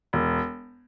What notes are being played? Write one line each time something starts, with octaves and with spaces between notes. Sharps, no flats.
E1